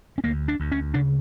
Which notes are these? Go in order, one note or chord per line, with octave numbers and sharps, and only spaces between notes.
C#4
D2 A#3
D4
D2
C#4
C#3 D4